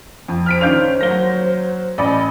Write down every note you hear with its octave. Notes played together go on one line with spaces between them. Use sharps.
F2
C5 F6 B6 D7
D#3 C#4 D4 F5 G6 F7
F#3 A#3 A#6 G7
A1 D5 D#5 B5